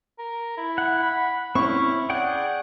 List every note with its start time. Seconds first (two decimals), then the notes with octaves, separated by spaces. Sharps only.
0.18 A#4
0.57 E4
0.78 F#5
1.02 B5
1.55 C4 C#4 E4 C#6
2.10 G#4 D5 F#5 G5